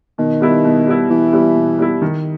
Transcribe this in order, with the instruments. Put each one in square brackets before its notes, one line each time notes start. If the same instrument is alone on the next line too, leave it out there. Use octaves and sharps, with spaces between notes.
[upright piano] B2 [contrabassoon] D#3
[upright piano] G3 B3 E4
B2
G3 B3 E4
[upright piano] B2 [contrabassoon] E3
[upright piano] G3 B3 E4
B2
G3 B3 E4
D#3